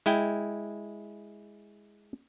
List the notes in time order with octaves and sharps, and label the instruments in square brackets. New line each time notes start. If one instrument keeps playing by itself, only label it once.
[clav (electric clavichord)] G#3 E4 G5